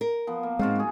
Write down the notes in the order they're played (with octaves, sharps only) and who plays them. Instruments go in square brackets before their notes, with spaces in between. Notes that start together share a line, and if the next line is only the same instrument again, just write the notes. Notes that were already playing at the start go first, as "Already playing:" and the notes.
[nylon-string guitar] A#4
[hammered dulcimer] F3 B3
A#3
[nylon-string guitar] G#2 C4 [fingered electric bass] G#3 [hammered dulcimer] F4 F#4
[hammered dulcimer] F#4 G#4